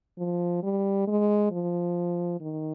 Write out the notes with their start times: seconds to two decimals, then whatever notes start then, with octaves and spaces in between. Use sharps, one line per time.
0.18 F3
0.63 G3
1.07 G#3
1.51 F3
2.40 D#3